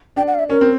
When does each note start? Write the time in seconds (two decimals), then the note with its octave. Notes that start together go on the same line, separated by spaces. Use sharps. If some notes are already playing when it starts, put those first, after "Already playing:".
0.16 D4 G5
0.27 F#5
0.34 F5
0.39 E5
0.50 C#4 A#4
0.61 C4